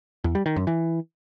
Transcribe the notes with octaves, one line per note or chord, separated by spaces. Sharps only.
E2
G3
D#3
F#2
E3